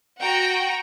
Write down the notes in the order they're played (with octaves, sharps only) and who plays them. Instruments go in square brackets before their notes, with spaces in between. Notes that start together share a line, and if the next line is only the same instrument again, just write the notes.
[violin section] F#4 F#5 G5 A#5